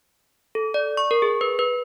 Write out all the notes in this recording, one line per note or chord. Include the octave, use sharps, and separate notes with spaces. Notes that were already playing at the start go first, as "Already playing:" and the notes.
A4
D5
C#6
A#4
G#4
B4
B4